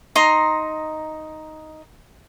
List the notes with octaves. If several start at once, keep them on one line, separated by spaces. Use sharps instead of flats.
D#4 A#5 C6